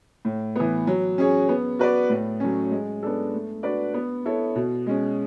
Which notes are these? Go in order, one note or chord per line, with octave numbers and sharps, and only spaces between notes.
A2
E3 B3
F#3
C#4 G#4 C#5
B3
F#4 B4 D5
A2
F#3 A3 C#4
G#3
B3 D4 A4
A3
D4 F#4 B4 D5
B3
E4 A4 C#5
B2
G#3 C#4